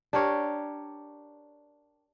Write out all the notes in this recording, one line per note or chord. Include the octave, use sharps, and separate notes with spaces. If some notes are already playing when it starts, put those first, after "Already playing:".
D4 G4 A#4 C#5